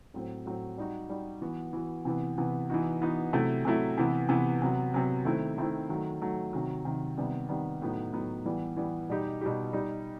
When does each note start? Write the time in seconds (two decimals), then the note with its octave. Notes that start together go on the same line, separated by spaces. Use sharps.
0.14 A2 F#3 C4
0.46 A2 F#3 C4
0.78 G3 D#4 F#4
1.10 G3 D#4 F#4
1.42 E3 B3 F#4
1.73 E3 B3 F#4
2.05 C3 E3 B3
2.38 C3 E3 B3
2.70 E3 B3 D#4 F#4
3.01 E3 B3 D#4 F#4
3.33 C3 F#3 A3 E4
3.65 C3 F#3 A3 E4
3.97 C3 E3 B3
4.29 C3 E3 B3
4.62 C3 F#3 B3
4.94 C3 F#3 B3
5.25 D#3 A3 C4 E4
5.58 D#3 A3 C4 E4
5.89 D#3 F#3 A3
6.22 D#3 F#3 A3
6.53 C3 D#3 F#3
6.85 C3 D#3 F#3
7.17 C3 D#3 G3 B3
7.49 C3 D#3 G3 B3
7.82 A2 F#3 B3 D#4
8.13 A2 F#3 B3 D#4
8.45 E3 G3 B3
8.77 E3 G3 B3
9.09 B2 G3 D#4 G4
9.41 B2 G3 D#4 G4
9.73 G3 D#4 G4